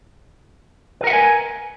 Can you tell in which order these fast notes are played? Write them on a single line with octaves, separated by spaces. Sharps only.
B4 A#4 F#5 E5 G#5